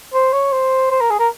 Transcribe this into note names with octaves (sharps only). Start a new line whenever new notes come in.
C5
C#5
C5
C5
A#4
G#4
A#4